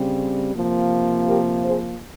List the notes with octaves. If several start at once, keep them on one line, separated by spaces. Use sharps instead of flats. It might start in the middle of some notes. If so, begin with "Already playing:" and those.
Already playing: C#3 G3 C4
C3 F3 A#3
G4 A#4
G#4 C5